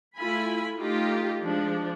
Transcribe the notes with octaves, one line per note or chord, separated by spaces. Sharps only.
A3 E4 F4 G#5 B5
A3 D#4 F4 G4
F3 G#3 D4